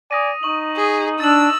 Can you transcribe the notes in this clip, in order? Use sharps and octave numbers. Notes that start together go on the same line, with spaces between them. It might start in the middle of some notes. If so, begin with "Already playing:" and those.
D5 G#5 D#6 A#6 D#7
D#4 C#6 F#7
G#4
D4 E6 A6 F#7